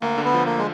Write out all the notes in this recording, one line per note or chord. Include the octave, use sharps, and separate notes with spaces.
D2 A#3
D3
B3
F3
A#3
G#3